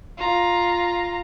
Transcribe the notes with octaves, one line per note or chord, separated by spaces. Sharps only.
F4 A#5